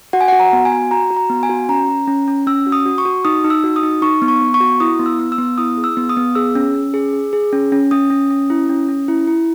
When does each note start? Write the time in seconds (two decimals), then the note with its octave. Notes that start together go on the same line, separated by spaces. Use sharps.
0.13 F#4 F#5
0.21 G#5
0.28 F#4 F#5
0.39 A#5
0.53 B3
0.65 G#5
0.72 F#4
0.91 F#4 A#5
1.11 F#4
1.17 A#5
1.30 B3
1.43 G#5
1.49 F#4
1.69 C#4 A#5
1.88 C#4
2.07 C#4
2.28 C#4
2.47 C#4 E6
2.66 F#4
2.72 D#6
2.86 F#4
2.98 C#6
3.05 F#4
3.25 D#4 D#6
3.44 D#4
3.50 E6
3.64 F#4
3.76 D#6
3.83 D#4
4.02 D#4 C#6
4.22 B3
4.28 C#6
4.41 B3
4.54 C#6
4.61 F#4
4.80 E4 D#6
4.99 B3
5.06 E6
5.19 B3
5.32 E6
5.38 B3
5.58 E4 D#6
5.77 G#4
5.84 E6
5.97 B3
6.09 D#6
6.17 B3
6.35 G#4 E6
6.55 C#4
6.75 C#4
6.94 G#4
7.13 G#4
7.33 G#4
7.53 C#4
7.72 C#4
7.91 C#4 D#6
8.10 C#4
8.30 C#4
8.50 E4
8.69 C#4
8.89 C#4
9.08 E4
9.27 E4